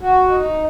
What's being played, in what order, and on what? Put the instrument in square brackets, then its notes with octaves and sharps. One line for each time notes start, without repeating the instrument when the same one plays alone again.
[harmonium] F#4
D#4